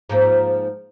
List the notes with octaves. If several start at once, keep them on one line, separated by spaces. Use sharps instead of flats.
G#2 F3 A#3